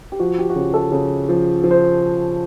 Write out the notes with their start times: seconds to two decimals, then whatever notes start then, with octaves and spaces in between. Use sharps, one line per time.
0.12 G4
0.20 F3 F#4
0.39 G4
0.50 F#4
0.56 C#3 G4
0.74 A4
0.92 C#3
1.29 F3
1.64 F3
1.71 C5